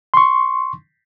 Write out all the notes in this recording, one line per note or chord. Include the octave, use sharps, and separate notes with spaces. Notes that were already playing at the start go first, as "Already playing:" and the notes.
C6 C#6